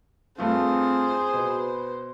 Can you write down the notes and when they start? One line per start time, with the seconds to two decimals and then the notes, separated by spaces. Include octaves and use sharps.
0.38 G2 A3 C4 F4 G#4 C5
1.33 B2 B4